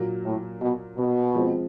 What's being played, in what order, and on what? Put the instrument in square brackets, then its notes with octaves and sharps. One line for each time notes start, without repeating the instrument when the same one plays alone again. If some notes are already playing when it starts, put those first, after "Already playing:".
Already playing: [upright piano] A#2 F#3 A#3
[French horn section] A2
B2
B2
[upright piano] F3 G#3 C4